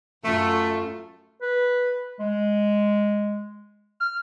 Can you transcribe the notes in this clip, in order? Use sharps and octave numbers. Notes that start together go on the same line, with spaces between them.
F#2 A3 F4
B4
G#3
F6